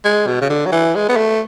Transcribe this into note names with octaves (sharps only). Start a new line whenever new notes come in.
G#3
B2
C#3
D3
F#3
E3
G#3
B3
A3